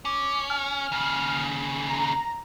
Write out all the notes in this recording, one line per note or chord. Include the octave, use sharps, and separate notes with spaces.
C#4 D6
G#5 F6
D#2 C#3
A#5